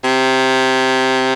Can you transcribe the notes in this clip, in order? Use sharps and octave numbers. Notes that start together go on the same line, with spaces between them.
C3